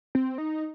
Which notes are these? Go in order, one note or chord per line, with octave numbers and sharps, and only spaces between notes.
C4
D#4